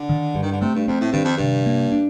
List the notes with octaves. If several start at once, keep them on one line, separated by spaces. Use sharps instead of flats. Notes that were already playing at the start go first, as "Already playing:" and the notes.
Already playing: D3
D#3
G2
D#3
D3
C3 A3
G2
F2 C4
A2
G2 D#3
F2
G2 C3
A#3
D4